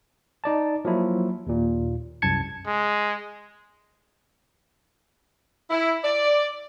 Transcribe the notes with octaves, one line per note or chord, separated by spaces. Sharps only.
D#4 D5 A5
F3 F#3 A#3 E4
D#2 A#2
C2 F#2 A5 G#6 C#7
G#3
E4
D5